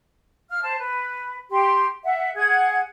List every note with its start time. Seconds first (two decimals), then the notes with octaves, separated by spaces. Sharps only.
0.50 F5 F6
0.62 C5 A5
0.78 B4
1.50 G4 C6
2.04 E5 F#5
2.35 G#4 F#5 G#6